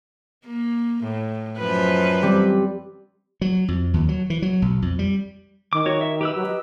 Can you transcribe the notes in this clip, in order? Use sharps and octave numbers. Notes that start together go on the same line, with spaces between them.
A#3
A2
F#2 F3 B4
G3 C4
F#3
F2
D#2
F#3
E3
F#3
B1
F2
G3
D#3 D6
F#4 C#5
E5
G4 B4 E6
F#3
D#5